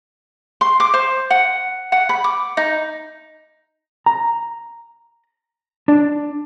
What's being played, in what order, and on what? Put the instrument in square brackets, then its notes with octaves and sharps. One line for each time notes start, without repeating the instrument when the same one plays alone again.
[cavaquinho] C6
D6
C5
F#5
F#5
B5
D6
D#4
[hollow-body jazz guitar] A#5
D4